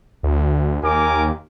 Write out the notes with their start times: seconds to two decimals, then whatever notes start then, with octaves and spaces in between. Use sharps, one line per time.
0.23 D2
0.83 D#2 A#4 G#5 D6